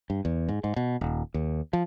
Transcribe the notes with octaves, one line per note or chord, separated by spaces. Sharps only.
G2
E2
G#2
G#2
B2
D#1
D#2
F3